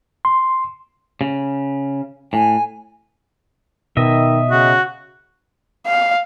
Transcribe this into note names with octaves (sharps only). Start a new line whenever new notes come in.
C6
C#3
A2 G#5
B2 D#3 D#5 E5
C#3 F#4
F5